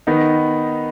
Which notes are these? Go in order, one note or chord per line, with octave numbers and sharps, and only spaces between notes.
D#3 B3 D#4